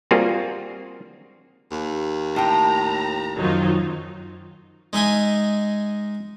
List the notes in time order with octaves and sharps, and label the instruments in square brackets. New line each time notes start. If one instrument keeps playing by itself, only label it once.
[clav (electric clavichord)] G3 A#3 C4 F4 F#4 G#4
[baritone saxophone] D#2
[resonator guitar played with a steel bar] A2 G5 [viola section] A#5
[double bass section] F#2 D#3 F3 [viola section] F#3 D#4 F4
[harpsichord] G#3 D#4 E5 G#5